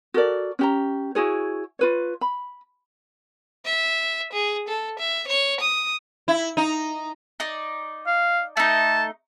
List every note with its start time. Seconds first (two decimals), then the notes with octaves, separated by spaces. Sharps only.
0.14 F#4 A4 A#4 D5
0.59 C#4 G4 A#5
1.15 E4 F#4 G#4 C#5
1.79 F4 B4 C#5
2.21 B5
3.65 E5
4.33 G#4
4.68 A4
4.99 E5
5.28 C#5
5.61 D#6
6.28 E4
6.57 D#4
7.40 D#4 D5
8.07 F5
8.57 A3 D#4 A5